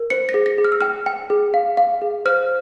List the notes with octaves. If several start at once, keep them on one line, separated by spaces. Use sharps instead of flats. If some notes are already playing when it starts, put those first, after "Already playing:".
Already playing: A#4
C5 C#7
A#6
G#4
A#6
G#4
F6
E6
G5 F6
G5
G#4
F5
F5
G#4
C5 F6